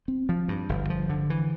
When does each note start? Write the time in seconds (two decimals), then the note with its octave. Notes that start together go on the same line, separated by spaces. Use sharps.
0.08 C4
0.29 F3
0.48 G2
0.69 G1
0.90 F3
1.09 D3
1.30 E3